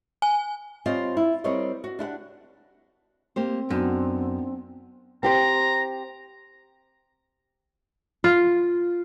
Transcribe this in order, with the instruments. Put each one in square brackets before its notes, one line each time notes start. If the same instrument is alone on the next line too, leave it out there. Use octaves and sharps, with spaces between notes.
[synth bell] G#5
[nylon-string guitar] G3 C4 F4 C5 C#5 D#5
E4
G3 C4 A#4 C#5 D#5
F#4
D4 E4 G4 F#5
[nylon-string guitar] A#3 G4 C5 [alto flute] C4
[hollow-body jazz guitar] F#2 [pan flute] B3 [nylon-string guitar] D4 D#4
[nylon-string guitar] C4 G4 C5 [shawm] A#5
[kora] F4